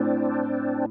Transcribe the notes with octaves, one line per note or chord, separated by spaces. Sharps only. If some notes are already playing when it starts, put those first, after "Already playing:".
Already playing: A2 C4 D4